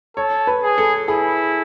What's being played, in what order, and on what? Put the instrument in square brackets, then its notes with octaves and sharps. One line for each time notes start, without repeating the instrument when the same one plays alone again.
[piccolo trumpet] A4 [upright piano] C#5
[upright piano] B4
[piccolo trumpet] G#4
[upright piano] A4
[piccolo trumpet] E4 [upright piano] G#4